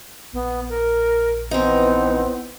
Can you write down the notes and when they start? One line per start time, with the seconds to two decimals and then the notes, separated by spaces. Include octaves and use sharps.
0.33 A#1 B3
0.69 A#4
1.51 E3 B3 C4 D#4